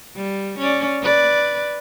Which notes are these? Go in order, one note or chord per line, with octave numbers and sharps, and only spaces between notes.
G3
C#4 D5
B4 D5